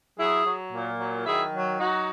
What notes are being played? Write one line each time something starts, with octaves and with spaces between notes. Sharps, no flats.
F#3 E4 G#4
F#3
A#2
F#3
D#3 E4 G#4
F#3
F#3 D#4 F#4